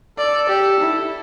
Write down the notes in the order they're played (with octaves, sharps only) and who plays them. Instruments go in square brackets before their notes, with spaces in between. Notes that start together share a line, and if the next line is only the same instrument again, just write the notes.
[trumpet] A4 [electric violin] D5
[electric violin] G4
E4